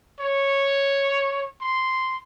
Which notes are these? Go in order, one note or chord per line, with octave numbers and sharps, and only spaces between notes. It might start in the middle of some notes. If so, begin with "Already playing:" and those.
C#5
C6